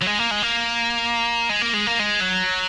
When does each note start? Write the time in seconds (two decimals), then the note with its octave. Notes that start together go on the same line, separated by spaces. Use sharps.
0.01 F#3
0.06 G#3
0.19 A#3
0.31 G#3
0.43 A#3
1.50 G#3
1.62 A#3
1.74 G#3
1.87 A#3
2.00 G#3
2.21 F#3